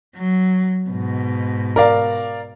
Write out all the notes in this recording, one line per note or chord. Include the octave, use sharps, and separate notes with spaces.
F#3
G#2 B2
A#4 D5 F5